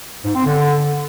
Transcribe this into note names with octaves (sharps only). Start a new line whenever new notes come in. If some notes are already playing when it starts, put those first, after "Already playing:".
G#2
C4
D3